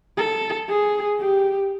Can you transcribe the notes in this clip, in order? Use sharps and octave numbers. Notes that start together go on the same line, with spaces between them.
A4
G#4
G4